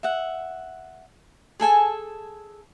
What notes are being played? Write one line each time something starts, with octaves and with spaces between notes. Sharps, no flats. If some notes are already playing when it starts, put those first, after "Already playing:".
E5 F#5
G#4 A4 G#5 A5